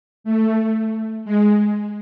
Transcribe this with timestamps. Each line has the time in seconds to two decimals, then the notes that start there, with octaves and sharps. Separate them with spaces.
0.24 A3
1.25 G#3